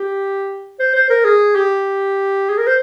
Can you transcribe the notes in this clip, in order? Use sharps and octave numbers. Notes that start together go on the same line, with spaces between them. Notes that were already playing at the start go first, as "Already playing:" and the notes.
Already playing: G4
C5
C5
A#4
G#4
G4
G#4
A#4
C5